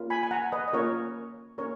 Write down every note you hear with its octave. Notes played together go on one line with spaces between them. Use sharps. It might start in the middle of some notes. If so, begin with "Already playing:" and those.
Already playing: A#3 C#4 F4
G#5 B5
G#5
F#5 A#5
B4 D#5
D#5
A#3 C#4 F4 A#4 C#5
A#3 C#4 A#4 C#5